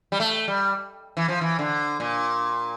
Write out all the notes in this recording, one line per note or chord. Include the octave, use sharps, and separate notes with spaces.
G3
A3
G3
E3
F3
E3
D3
A#2